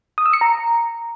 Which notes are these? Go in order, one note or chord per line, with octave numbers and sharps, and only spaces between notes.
D#6
E6
C#7
A#5